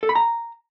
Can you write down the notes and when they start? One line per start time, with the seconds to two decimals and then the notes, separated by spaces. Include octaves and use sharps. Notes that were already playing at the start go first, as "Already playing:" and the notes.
0.03 A4
0.09 B5
0.15 A#5